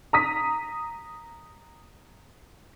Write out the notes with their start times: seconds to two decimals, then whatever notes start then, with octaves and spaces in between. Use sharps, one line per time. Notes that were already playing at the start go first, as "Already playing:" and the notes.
0.13 A#5 D#6 B6